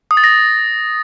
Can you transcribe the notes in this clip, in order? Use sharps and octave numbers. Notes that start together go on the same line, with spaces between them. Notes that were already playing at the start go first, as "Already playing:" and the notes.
D#6
A6
A#6